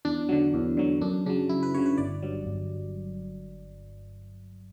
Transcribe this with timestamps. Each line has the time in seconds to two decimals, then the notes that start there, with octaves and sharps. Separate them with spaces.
0.05 E2 D4
0.29 D3 F#3
0.54 E2
0.77 D3 F#3
1.01 F#2 D4
1.26 C#3 F#3 D4
1.49 F#2 E4
1.63 B4
1.74 C#3 F#3 C#5
1.86 B4
1.98 G1 D5
2.22 G2 F#3
2.46 G1